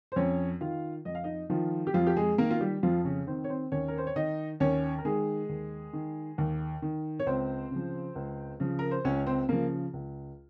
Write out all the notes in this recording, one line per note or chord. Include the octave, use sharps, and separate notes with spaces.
C5
F2 C#4 C#5
D#3 F4 F5
F2 D#5
F5
D#4 D#5
D#3 F3 F4
G4
F2 F3 F4
G4
G#3 G#4
D#3 A#3 A#4
F4
G3 G4
F2 F3 F4
C#3 C#4
D#3 C4 C5
C#5
C4 C5
D#2 C#4 C#5
A#4
C5
C#5
D#3 D#4 D#5
D#2 C#4 C#5
A#4
D#3 G#3 G#4
D#2
D#3
D#2
D#3
C#5
C#2 C4 C5
C#3 F3
C#2
C#3 F3
A#4
C5
C#2 C#4 C#5
C4 C5
C#3 F3 A#3 A#4
C#2